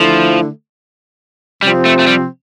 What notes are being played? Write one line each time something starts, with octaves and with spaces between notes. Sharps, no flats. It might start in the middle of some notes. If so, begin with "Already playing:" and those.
Already playing: D3 F3 A3 E4
C3 F3 G3 C4
A3
A3
G3